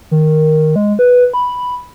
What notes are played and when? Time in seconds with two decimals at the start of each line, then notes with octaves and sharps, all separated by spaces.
0.11 D#3
0.76 G#3
0.99 B4
1.34 B5